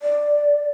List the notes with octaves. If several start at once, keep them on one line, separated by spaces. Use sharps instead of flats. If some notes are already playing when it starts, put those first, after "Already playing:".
D5